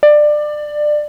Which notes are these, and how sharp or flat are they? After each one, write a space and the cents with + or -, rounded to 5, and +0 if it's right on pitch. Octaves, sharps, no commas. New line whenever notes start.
D5 +20